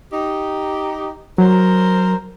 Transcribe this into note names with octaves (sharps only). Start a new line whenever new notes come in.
D#4 G4
F#3 A#4 C5